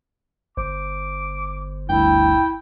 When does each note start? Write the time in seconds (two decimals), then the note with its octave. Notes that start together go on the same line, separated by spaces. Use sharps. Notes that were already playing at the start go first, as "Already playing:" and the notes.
0.57 G1 C5 D6
1.89 D2 G2 E4 G5